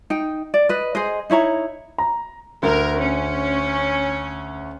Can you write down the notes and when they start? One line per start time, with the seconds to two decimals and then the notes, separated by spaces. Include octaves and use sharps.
0.10 D#4 G5
0.54 D5
0.69 B4 D#5
0.95 G#4 C5 D#5
1.30 D#4 E4 C#5 A#5
1.98 A#5
2.63 D2 A#4
2.99 C#4